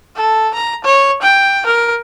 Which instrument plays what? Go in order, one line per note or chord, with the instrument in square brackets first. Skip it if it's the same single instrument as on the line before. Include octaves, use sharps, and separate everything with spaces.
[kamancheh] A4
A#5
C#5
G5
A#4